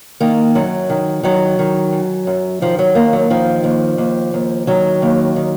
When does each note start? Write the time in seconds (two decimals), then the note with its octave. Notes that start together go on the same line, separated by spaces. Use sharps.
0.20 D#3 A#3
0.55 F#2 F#3
0.90 D#3
1.23 D#3 F#3
1.59 D#3
1.93 F#2
2.27 F#2
2.62 D#3 F3
2.79 F#3
2.95 D#2 A#3
3.13 F#3
3.30 D#3 F3
3.64 D#2
3.98 D#2
4.34 D#2
4.67 D#3 F#3
5.02 D#2
5.36 D#3